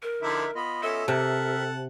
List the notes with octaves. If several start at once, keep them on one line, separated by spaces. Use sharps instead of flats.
A#4
D3 F3 D#4 E4 E5
B3 F4 D#5 B5
C#4 A4 E5
C3 A#4 E5 F#5 A5